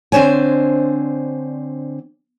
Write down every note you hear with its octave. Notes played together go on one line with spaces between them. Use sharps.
D3 C4 D4 C5 C#5 G#5